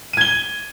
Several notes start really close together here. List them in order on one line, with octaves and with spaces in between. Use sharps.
D#7 G#6 G7